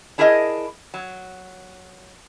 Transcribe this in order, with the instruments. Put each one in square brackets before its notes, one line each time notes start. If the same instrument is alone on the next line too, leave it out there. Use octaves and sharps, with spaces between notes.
[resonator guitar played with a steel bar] D4 E4 G#4 A#4 D5 D#5
F#3